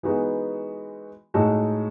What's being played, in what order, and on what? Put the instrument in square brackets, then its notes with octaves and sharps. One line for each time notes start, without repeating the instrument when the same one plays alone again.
[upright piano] E3 G#3 B3 D#4 F#4
A2 G#3 D#4 F#4 A4